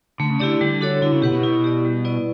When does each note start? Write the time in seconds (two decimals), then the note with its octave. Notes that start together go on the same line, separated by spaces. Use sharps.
0.20 D3 A3
0.30 C#3
0.40 D3 E4 G4 D5
0.61 D3 G3
0.81 D4 F#4 A4 C#5
1.02 D3 E4
1.12 C#3
1.22 B2 G4 B4 F#5
1.33 B2
1.43 E4
1.64 G4 D5
1.85 G3
2.05 B3 E4 B4 D5